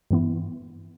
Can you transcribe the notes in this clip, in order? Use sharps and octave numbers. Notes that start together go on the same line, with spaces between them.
G2 E3 B3 E4